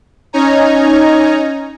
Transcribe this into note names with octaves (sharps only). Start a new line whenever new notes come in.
C#4 D#4 C#5 G#5 A#5